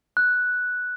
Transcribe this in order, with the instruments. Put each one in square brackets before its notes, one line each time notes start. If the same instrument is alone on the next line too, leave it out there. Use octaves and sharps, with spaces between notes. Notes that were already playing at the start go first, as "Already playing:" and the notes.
[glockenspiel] F#6